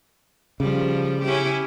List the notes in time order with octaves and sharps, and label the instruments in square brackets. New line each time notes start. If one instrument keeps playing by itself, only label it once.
[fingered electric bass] C#3 [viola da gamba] F3 G3
[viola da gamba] C#4 E4 G4